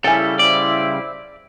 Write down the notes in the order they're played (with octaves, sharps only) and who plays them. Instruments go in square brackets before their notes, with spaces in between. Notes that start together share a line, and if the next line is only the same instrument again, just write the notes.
[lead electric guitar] C#3 G3 [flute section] C#4 E4 [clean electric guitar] A4 [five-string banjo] G5 G#5
[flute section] E4 C5 [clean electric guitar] D5